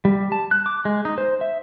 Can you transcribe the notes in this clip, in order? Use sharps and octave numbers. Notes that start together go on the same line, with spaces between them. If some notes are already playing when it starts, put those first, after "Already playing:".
G3
A5
F#6
D6
G#3
D#4
C5
E5